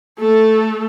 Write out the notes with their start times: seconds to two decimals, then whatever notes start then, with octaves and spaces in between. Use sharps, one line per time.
0.19 A3 A4